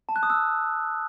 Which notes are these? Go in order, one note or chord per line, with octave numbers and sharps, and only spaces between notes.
A5
F#6
D#6
E6